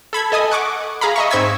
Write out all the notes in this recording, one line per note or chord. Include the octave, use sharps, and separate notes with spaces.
A4 B5 G#6
A4 D#5 G#5 D#6
F#5 C#6 D6
G#4 F5 A#5 B5
D#5 E5 C#6
G#2 C4 C#6 E6 G#6 B6